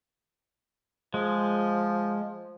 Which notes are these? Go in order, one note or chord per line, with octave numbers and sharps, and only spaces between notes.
F3 G#3